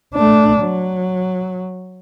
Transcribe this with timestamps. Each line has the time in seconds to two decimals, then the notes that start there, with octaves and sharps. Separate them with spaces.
0.14 A3 D4
0.62 F#3